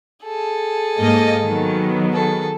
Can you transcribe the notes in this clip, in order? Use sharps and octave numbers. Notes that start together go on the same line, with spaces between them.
G#4 A4
G#2 A#3 D#5
D#3 F#3 B3
G#4 A4